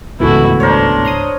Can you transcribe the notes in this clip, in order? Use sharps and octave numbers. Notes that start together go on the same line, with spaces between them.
G1 C#2 G#2 B2 E3 A3 E4 F#4
D4 A#4 C5 C#5
A#5 C6 D#6